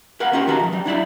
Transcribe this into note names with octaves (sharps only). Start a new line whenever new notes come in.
A#4 B4 F5 F#5
C#4 F4 G4 A#4
D#3 F4 F#4 A4 B4 A#5
B1 F3
F#3 G3
D4 E4 D5 E5